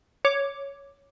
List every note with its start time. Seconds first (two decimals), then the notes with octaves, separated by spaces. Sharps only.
0.25 C#5 D6